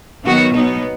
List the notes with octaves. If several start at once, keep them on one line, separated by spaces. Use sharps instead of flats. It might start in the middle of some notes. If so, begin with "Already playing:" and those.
D#3 F#3 B3 F#4
B2 F#3 B3 D#4